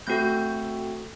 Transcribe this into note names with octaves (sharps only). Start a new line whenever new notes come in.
A3 C4 F#4 A4 G6